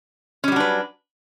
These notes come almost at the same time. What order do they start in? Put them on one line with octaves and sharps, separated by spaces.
C#4 G3 F#3 D4 B4